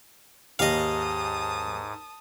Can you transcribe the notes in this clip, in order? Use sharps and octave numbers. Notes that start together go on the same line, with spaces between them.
D#2 G#2 G4 D#5 F5 A5 D#6